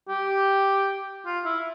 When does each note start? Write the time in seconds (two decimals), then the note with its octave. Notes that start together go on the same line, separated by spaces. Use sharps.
0.09 G4
1.26 F4
1.45 E4